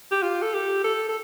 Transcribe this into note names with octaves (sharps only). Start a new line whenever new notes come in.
G4
F4
A4
G4
A4
A4